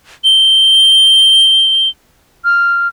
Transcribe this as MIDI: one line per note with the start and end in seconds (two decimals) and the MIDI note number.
0.24 1.89 103
2.45 2.88 89